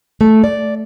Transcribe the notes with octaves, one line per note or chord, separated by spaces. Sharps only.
A3
D5